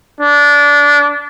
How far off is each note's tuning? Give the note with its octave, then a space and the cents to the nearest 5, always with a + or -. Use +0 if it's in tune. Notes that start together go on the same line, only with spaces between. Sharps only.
D4 -20